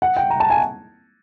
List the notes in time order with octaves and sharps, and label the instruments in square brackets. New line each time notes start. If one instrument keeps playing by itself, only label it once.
[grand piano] F#5
G5
A#5
A5
G#5